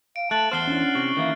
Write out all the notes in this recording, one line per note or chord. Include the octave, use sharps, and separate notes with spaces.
F5 D7
A3 A5 F#6 A6 F#7
E2 C5 F#5 F6 C7 G7
C#4 D4 E4
C3 C#6
D#3 E3 A#3 E5